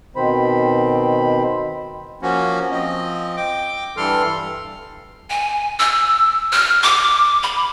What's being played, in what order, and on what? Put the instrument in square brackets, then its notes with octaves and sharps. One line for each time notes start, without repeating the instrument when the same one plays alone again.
[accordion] B2 D#3 C4 C5 B5
F3 A#3 C#4 F#4
F3 C4 D#5
G5 D6
G2 E3 G3 A4 C6 F6
[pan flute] G#5
E6
F6
D6
B5